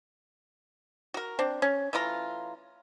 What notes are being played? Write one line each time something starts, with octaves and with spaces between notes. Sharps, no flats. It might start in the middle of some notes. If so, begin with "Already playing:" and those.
F#4 A#4
C4 D4
C#4
E3 A3 F4 A#5